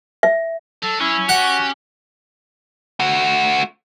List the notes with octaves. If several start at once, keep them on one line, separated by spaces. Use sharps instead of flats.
E5
F#3 A4
C#4 E4
F#4 G4 F#5
A3 F#4